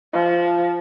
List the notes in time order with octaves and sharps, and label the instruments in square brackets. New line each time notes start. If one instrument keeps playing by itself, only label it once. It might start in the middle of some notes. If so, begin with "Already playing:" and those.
[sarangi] F3